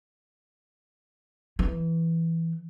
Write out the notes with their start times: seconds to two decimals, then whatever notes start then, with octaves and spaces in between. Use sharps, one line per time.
1.59 E3